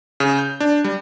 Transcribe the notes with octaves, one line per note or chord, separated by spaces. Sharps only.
C#3
G6
D4
G3